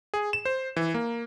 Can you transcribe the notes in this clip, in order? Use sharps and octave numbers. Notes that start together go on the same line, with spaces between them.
G#4
E7
C5
E3
A#3